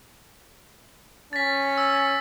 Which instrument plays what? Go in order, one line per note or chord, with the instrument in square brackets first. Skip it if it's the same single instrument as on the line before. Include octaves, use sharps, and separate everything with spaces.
[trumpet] C#4 [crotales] A6 B6
[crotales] E6